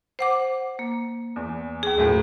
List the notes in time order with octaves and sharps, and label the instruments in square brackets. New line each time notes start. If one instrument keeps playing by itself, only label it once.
[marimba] C5 F#5 D6
A#3
[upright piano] E2 E3
[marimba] D#2 G#4
[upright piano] F#2 A2 F3